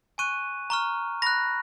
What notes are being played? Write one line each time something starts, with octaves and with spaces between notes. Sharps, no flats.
G#5 C#6 F#6 D#7
A#5 C#6 F6
B5 F#6 A#6